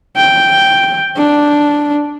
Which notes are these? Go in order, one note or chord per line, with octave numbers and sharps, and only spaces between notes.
G5
D4